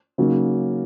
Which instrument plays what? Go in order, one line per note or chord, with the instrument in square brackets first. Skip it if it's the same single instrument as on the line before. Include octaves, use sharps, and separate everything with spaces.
[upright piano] C#3 F#3 A#3 D#4